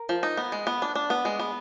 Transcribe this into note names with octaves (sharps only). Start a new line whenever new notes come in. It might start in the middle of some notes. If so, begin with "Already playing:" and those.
Already playing: A#4
F3
D#4
B3
G#3
B3
D4
D4
B3
G#3
B3